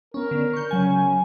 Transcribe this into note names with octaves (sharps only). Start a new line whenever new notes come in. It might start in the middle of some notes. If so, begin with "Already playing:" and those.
B3 C#4 A#4
D3
C#6 G6
C#3 F#3 C#4 G#5